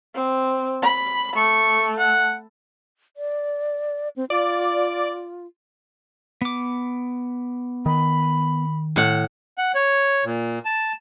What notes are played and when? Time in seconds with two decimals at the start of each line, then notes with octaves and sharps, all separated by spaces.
0.15 C4
0.83 B5
1.36 A3 C#6
1.99 F#5
3.17 D5
4.16 C4
4.30 F4 D5
6.41 B3 D6
7.86 D#3 B5
8.96 A2 F#5
9.58 F#5
9.75 C#5
10.25 A#2
10.65 A5